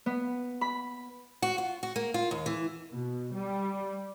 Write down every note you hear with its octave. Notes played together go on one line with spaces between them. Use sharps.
B3
B5
F#4
F4
F#4
A#3
F4
D#2
E3
B2
G3